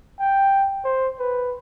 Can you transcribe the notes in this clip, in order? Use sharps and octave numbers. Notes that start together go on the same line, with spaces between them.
G5
C5
B4